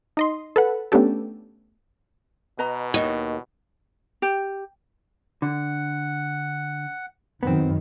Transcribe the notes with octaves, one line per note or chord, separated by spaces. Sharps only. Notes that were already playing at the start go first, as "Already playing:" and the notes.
D#4 D#5 C6
A4 B4 F#5
A3 B3 C#4 D4 G4 A4
B2 B4 D#5 A#5
D#2 C#5 D#5
G4
D3 F#5
F#2 D#3 B3 C4